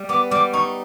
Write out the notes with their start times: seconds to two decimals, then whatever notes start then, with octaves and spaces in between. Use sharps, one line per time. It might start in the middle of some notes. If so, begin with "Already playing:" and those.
Already playing: G3 G4
0.09 B3 D6
0.31 G3 D6
0.53 D#4 C#6